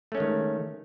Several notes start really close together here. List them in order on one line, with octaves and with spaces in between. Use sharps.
A3 C#4 G#3 D#3